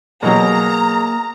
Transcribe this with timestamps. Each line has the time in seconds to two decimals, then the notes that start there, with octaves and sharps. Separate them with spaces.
0.23 B2 F#3 A#3 G#4 A#5